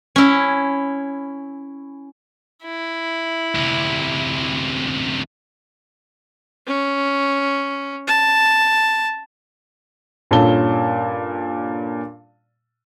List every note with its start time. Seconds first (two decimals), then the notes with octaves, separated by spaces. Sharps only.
0.16 C#4 E4
2.64 E4
3.55 D2 C3
6.67 C#4
8.07 A5
10.31 G2 A#2 C#4 A4 A5 G7